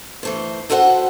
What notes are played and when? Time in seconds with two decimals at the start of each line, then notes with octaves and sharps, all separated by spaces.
0.23 E3 A3 C5
0.70 F#4 A4 B4 C5 F5 F#5